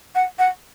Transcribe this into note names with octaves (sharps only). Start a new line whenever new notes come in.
F#5
F#5